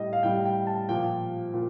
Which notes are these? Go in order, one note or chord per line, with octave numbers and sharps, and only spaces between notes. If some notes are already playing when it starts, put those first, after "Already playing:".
Already playing: A2 G3 D#5
F5
A2 G3 G5
G5
A5
A#2 F3 G5
A#2